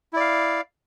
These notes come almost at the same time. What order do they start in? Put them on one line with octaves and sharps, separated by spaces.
E4 D5 F5